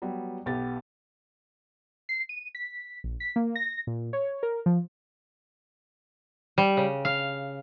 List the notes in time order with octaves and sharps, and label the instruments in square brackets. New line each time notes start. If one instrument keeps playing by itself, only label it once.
[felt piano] F#3 G3 B3
B1 B3 G4 A6
[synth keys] C7
D#7
B6
A#1
B6
A#3
A#6
A#2
C#5
A#4
F3
[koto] G3
C#3
F5